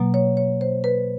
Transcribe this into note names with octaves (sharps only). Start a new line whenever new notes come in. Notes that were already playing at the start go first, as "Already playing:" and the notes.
Already playing: B2 F#3 A#3
C#5
C#5
C5
B4